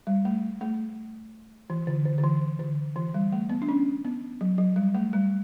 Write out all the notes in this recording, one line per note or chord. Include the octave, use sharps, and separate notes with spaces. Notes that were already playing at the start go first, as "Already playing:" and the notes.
G3
A3
A3
E3
D3
D3
D3
E3
D3
E3
G3
A3
B3
D4
C#4
B3
F#3
F#3
G3
A3
G3